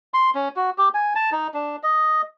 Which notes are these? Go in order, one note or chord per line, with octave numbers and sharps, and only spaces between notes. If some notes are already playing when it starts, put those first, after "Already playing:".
C6
C#4
F#4
G4
G#5
A5
D#4
D4
D#5